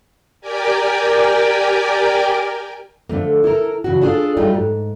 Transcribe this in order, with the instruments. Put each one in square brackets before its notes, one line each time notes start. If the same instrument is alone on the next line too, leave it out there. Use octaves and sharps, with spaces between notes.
[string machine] G4 A#4 D5 G5 G#5
[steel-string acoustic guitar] D3 F3 A3 A#3
E4 A4 A#4
C#3 E3 F#3 F#4
D4 F4 G#4 A4
F#3 G3 A3 D#4 F4
G#2